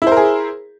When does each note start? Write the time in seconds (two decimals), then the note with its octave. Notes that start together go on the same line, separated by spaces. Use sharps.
0.02 E4
0.07 C5
0.12 A#4
0.17 G#4